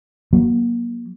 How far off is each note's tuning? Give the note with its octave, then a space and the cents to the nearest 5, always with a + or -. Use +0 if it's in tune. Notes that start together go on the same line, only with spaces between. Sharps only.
F#3 +0 A#3 +25